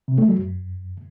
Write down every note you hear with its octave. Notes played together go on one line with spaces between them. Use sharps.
C3
A3
F#3
F#2